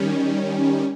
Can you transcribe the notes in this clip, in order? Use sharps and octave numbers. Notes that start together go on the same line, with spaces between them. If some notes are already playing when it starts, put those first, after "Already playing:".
Already playing: D#3 G3 C#4